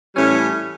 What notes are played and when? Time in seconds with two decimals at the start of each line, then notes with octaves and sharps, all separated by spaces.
0.14 A2 E3 G3 C#4